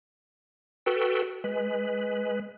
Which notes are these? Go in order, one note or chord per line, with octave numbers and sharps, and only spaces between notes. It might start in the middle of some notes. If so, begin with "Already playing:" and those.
F#4 A4 B4 G5 E6
G#3 B4